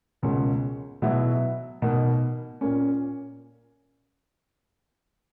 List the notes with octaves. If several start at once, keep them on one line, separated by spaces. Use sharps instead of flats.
C#2 B2 A#3 C#4
B2 F#3 B3 E4
B2 A#3 D#4
A#2 A#3 C#4